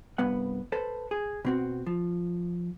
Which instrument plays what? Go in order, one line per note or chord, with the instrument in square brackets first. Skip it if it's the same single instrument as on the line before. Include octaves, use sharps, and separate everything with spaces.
[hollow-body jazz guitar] C2 G2 B3 F#5
A4 B4 C5
G#4
B2 C4 F#4
F3